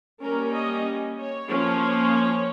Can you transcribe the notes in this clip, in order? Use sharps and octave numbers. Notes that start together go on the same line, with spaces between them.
G3 A#3 C#4 A#4
D#5
C#5
F3 A#3 C#4
C#5